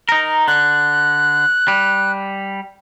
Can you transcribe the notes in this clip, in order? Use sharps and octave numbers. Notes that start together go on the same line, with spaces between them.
D#4 A#4
D3 F#6
G3